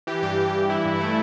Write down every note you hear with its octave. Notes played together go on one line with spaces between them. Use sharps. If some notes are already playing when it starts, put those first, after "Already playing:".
E3 G4
G2 G4
G2
E3
E3 E4
G2
A3